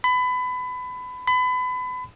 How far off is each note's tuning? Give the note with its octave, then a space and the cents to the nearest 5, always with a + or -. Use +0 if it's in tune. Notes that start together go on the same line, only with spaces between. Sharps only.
B5 +25
B5 +30